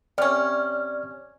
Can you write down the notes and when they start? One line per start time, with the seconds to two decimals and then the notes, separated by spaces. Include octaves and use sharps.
0.18 C3 C#4 D5 F6